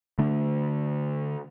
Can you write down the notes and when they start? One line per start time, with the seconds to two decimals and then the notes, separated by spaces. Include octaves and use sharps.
0.18 D3 A3 D4